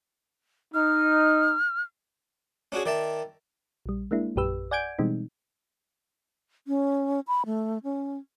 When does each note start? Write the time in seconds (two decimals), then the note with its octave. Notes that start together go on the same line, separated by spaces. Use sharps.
0.74 D#4 F6
2.72 C#4 D4 F#4 G#4
2.86 D#3 D5 E5 A5
3.86 A#1 G3
4.11 G#3 A#3 D4 E4
4.36 A#1 F#2 G4 B4 E6
4.71 D5 F#5 G#5 G6 G#6 D7
4.99 B2 E3 G3 G#3 C4 D#4
6.68 C#4
7.28 B5
7.46 A3
7.84 C#4